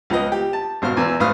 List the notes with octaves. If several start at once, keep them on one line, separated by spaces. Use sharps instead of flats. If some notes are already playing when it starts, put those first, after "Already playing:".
C#2 F3 B3 D#5
G4
A5
G#1 B2 C5 F5 F6
E2 E3 B3
G#1 A2 B4 F5 D#6 F6